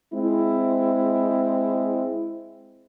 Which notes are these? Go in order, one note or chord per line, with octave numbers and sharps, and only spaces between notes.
G#3 C4 E4